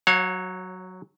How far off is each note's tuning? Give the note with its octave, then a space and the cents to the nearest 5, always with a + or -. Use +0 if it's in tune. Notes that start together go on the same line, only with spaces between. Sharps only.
F#3 +0 C#5 -20 F5 +40